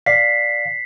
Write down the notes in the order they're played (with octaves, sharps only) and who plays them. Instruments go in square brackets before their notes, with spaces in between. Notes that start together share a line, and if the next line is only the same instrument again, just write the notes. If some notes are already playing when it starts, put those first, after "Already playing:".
[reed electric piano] D5 F5 [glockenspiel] B6 C7